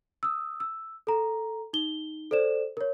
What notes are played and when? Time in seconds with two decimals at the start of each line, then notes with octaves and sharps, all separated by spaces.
0.23 D#6 E6
0.60 E6
1.07 A4 A#5
1.73 D#4 G7
2.31 A4 C5 D5 E7
2.77 A#4 C#5